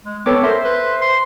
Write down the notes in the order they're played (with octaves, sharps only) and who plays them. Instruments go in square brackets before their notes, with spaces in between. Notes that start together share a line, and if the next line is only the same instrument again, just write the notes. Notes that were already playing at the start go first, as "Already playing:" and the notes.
[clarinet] G#3
[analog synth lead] B3 [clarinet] C4 [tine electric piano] A4 C#5 D6
[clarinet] A#4 [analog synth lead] C5 [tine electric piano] E5
[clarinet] B4
C6